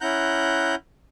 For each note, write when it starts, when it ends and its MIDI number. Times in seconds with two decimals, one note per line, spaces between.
0.01 0.75 61
0.01 0.75 64
0.01 0.75 78
0.01 0.75 82
0.01 0.75 90
0.01 0.75 91